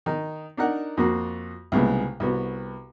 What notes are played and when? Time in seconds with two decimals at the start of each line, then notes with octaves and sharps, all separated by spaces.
0.06 D#3 D#4
0.57 D4 D#4 A#4 F#5
0.97 F2 A#3 F#4
1.72 C2 A#2 C#3 G#3 B3
2.20 C2 B3 F#4